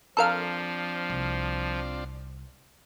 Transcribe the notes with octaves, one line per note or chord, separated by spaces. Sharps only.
F3 C4 D4 F4 A4 A#4 F5
C2